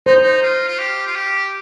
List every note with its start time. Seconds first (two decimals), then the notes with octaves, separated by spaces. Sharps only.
0.06 D#4 C5
0.22 D#4
0.42 F4
0.68 F4
0.79 G4
1.06 F4
1.16 G4